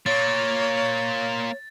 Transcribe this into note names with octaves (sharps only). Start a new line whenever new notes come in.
A#3 F4 C#5 A6